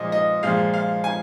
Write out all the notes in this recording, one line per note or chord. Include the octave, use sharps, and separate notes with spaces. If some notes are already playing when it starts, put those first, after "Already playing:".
Already playing: A#2 F3 G#3 D#5
D#5
A#2 F3 G#3 F5
F5
G#5